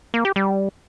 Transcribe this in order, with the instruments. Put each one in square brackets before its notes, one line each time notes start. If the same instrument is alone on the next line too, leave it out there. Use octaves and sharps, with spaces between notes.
[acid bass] A#3
G4
G3